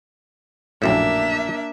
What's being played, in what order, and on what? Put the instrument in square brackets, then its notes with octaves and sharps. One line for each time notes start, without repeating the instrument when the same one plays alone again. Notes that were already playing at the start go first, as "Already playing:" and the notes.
[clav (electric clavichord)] A#1 F#2 A2 [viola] A#3 D4 [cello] E5